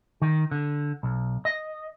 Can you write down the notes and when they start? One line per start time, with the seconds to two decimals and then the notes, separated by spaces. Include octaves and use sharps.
0.22 D#3
0.51 D3
1.03 B1
1.45 D#5